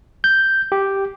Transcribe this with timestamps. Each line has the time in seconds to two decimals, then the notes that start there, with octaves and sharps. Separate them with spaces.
0.24 G6
0.72 G4